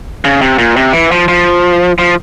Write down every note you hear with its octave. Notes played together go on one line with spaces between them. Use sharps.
C#3
C3
A#2
C3
E3
F3
F3
F3